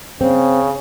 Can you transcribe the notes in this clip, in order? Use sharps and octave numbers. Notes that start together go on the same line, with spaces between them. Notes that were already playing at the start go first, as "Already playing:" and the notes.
C#3 C4